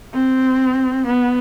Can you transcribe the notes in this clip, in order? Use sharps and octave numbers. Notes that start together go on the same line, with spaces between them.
C4
B3